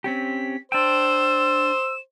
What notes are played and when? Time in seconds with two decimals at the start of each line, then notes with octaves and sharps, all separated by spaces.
0.04 C4 C#4 G4 B6
0.72 D4 C5 G5 E6 E7